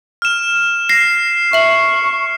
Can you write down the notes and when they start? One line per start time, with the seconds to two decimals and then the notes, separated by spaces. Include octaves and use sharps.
0.22 F6 E7
0.89 A#6 C7
1.53 E5 C#6 F#7